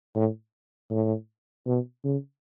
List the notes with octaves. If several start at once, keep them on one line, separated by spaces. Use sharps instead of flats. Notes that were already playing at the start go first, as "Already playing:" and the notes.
A2
A2
B2
C#3